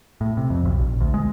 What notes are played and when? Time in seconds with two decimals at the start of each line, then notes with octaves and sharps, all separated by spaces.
0.21 A2
0.37 C3
0.50 F2
0.65 B1
0.79 A#1
1.01 D2
1.14 G#3